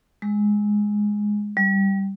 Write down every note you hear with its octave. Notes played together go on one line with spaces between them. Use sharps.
G#3
G3